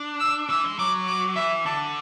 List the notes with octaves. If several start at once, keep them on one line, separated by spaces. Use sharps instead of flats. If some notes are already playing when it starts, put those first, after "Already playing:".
Already playing: D4
E6
E3 E6
G#3
F#3 D6
D6
E3 E5
D3 A5